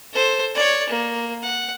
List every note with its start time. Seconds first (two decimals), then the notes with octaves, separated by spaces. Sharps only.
0.12 A4 C5
0.55 C#5 D5
0.89 A#3
1.42 F#5